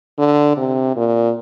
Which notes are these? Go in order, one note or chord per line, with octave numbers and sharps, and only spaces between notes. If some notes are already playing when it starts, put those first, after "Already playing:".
D3
C3
A#2